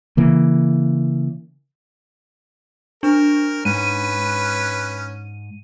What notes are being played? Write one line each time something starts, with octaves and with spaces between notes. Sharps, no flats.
C#3 E3 A#3
D4 A#4
G#2 C#4 B4 D#7